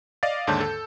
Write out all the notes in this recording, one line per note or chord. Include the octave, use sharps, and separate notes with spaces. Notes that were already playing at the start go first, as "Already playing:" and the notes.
D5 D#5 F5 D6 A6
D#2 G#2 D3 C#5 A5 G6
A4